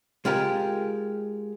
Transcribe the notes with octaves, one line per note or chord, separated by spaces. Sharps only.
G#3 F4 G4 A#4